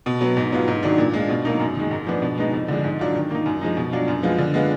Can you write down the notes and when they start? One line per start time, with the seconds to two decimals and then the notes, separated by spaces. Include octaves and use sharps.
0.06 B2
0.21 F#3 B3
0.37 G#2
0.52 F#3 B3 F4
0.68 G#2
0.83 D#3 F#3 D4
0.98 A#2
1.14 G#3 D4 F4
1.29 B2
1.45 F#3 A#3 D#4
1.60 F#2
1.76 D#3 G#3
1.91 G#2
2.07 F3 B3 D4
2.22 B2
2.38 G#3 B3 D#4
2.53 F2
2.68 D3 F3 G#3 D4
2.84 G#2
2.99 F#3 D4 F4
3.15 D#3
3.31 A#3 D#4
3.46 F#2
3.61 F3 G#3 D#4
3.77 B2
3.92 F#3 D4 F4
4.08 F#2
4.23 F3 G#3 B3 F4
4.38 D3
4.54 G#3 B3 F4